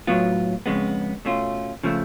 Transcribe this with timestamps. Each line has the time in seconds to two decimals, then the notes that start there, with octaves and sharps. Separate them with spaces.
0.07 A2 F#3 B3 F4
0.66 F2 C#3 G#3 B3
1.25 B2 A3 C#4 F4
1.84 C#3 F3 A3